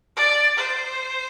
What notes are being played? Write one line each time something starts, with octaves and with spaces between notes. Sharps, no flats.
D5
C5